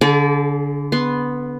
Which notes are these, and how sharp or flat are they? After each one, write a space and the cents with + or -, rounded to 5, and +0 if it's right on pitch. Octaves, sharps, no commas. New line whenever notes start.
D3 -25 G#4 +25 D5 -30
B3 +0 C6 +0